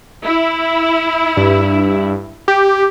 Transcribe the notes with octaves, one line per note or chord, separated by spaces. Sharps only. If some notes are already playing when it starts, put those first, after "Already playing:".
E4
G2
G4